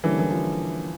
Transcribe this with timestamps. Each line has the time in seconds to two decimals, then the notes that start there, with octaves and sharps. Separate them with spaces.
0.04 D3 E3 G3 A#3 C#4 E4
0.19 E3
0.30 F3